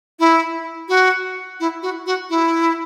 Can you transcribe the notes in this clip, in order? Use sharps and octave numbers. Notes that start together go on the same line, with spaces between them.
E4
F#4
E4
F#4
F#4
E4